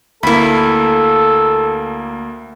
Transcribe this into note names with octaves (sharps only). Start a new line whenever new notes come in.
D2 A#3 E4 A4 B5